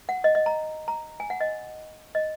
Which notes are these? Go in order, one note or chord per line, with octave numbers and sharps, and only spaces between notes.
F#5
D#5
D#5
A#5
A#5
G#5
F#5
D#5
D#5